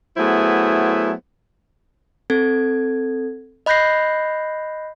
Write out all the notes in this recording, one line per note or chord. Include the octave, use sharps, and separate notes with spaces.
F#3 A3 B3 E4 G#4 C5
C4 A4 G#6
D#5 B5 F#6 G6 A#6 C7